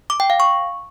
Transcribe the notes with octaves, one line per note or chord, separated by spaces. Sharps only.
D6
G5
F5
C#6